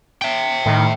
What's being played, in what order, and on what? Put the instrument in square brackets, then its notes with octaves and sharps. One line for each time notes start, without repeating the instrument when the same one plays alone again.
[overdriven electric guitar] E5 G5
[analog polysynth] A2 D#3